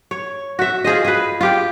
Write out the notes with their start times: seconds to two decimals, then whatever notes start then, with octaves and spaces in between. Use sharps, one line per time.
0.11 C#5
0.59 F#4 E5
0.84 F4 G#4 C5 D#5
1.05 G#4 B4
1.41 F4 G4 G5